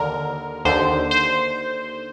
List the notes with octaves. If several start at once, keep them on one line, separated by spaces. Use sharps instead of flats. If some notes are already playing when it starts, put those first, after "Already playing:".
Already playing: D#2 D3 A#4
D#2 D3 C5
C5